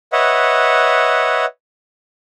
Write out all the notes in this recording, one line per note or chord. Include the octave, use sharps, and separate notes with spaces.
B4 C#5 D#5 E5 F#5